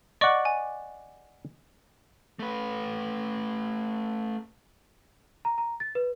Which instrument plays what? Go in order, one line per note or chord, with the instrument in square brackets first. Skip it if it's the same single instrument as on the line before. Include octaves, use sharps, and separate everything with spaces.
[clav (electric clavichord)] D5 F#5 [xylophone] D#5 C#6 D6
[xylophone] G#5
[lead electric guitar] A3 B4
[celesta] A#5
A#5
A6
B4